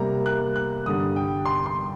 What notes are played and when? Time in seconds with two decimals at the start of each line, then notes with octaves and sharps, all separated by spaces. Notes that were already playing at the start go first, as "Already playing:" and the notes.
Already playing: C3 G3 A#3 A#5
0.26 F#6
0.56 F#6
0.86 G2 D3 G3 D#6
1.16 G5
1.45 C6
1.66 C6